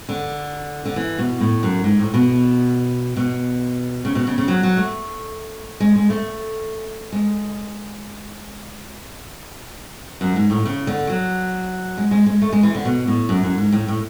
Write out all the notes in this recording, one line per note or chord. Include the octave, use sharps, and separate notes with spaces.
D3
D3
E3
B2
A2
F#2
G#2
A2
B2
B2
C#3
B2
C#3
C#3
F#3
F#3
A3
G#3
G#3
A3
G#3
F#2
G#2
A2
C#3
D3
F#3
G#3
G#3
G#3
A3
G#3
E3
D3
B2
A2
F#2
F#2
G#2
A2
A2